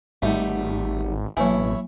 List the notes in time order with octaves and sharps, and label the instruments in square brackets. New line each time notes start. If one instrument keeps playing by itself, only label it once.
[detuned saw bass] G#1 [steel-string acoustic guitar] G3 D#4 F#5 [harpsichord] A3
[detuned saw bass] A1 [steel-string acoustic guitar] B2 [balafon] F#3 A#3 G#5 [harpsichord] E4 C#5